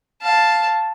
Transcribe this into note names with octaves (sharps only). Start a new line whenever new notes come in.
F5 A5